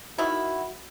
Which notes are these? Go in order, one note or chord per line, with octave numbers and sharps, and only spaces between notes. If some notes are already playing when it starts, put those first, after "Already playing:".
D#3 E4 F#4